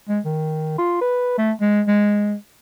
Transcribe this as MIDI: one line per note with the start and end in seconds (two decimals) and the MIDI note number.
0.09 0.20 56
0.25 0.77 51
0.78 0.97 65
1.01 1.37 71
1.38 1.52 57
1.61 1.82 56
1.87 2.35 56